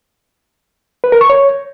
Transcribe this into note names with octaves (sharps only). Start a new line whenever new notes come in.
B4
A#4
C#6
C#5